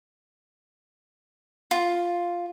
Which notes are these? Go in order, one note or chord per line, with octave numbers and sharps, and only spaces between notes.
F4